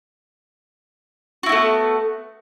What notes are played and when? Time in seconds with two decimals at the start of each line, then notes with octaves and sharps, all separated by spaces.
1.43 F#4
1.46 E4
1.49 B3
1.52 A3